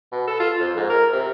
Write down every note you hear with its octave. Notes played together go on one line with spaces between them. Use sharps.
B2
A4
F4
F2
G#2
A#4
C3